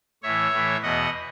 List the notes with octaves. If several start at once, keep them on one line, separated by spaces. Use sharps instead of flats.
A2 E3 C#5 E5
A2 E3
E2 B2 D#5 F#5